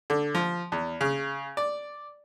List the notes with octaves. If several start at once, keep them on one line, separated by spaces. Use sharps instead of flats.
D3
F3
E2
C#3
D5